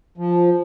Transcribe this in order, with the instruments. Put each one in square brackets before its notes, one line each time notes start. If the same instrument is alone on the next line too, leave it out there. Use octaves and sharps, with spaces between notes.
[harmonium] F3